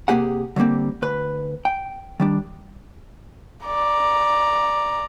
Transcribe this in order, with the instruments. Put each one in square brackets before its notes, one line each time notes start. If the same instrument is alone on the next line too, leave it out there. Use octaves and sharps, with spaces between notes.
[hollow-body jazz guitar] C3 D#3 A#3 G4 G#4 F#5
D3 F#3 G3 A#3 C4
D2 B4
G5
D#3 G3 D4
[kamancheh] D5 A#5